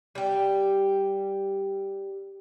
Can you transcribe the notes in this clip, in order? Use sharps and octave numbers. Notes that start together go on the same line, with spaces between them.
G3 G4